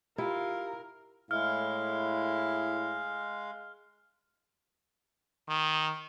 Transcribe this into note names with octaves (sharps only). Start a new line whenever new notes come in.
E4 F4 G4 A#4
A2 G#3 E4 F5 F6
D#3